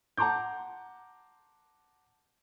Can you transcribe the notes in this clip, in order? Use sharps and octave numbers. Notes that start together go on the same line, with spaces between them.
F#5 A5 A#5 C6 D6 G6